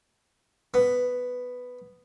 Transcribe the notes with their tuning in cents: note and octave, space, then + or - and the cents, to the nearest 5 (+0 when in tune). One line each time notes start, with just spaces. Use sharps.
B3 +5